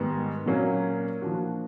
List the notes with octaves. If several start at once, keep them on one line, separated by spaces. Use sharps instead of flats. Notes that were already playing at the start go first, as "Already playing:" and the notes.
Already playing: G#2 D#3 G3 B3
A#2 F#3 A#3 C#4
F3 A#3 D4 F#4